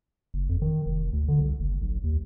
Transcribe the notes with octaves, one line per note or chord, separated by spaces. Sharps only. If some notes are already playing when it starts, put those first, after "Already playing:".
F#1
F2
D#3
F1
D2
D3
C2
F#1
B1
D#2